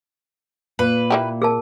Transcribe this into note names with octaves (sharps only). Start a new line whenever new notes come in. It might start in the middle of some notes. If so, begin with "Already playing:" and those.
A#2 B4
A#3 E4 G4
G#4 A#4 A5